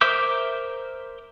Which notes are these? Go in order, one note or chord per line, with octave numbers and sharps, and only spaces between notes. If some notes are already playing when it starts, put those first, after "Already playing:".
A#4 C5 E5 D6 G6